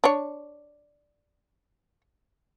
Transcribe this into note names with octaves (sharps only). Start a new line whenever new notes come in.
D4 C#5